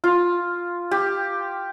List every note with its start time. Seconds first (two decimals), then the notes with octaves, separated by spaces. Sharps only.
0.04 F4
0.91 G4